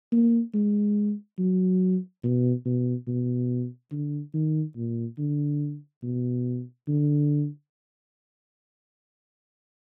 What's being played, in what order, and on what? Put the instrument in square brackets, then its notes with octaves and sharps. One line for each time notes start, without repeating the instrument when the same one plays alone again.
[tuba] A#3
G#3
F#3
B2
B2
B2
D3
D#3
A#2
D3
B2
D3